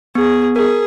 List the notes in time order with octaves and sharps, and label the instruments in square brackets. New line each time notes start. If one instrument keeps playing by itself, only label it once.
[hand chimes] B3 [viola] G#4
[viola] G#4 [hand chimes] A#4